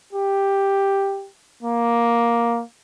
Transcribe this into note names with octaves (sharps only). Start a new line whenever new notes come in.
G4
A#3